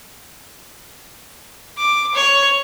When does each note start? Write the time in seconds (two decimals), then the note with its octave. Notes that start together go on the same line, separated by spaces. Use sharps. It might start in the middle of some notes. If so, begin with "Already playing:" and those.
1.78 D6
2.15 C#5